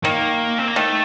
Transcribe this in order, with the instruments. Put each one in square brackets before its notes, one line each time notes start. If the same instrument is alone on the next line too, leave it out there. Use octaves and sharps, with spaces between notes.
[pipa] D#3 [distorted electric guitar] A#3
[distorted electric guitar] C4
A#3
[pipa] D#3 [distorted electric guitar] A3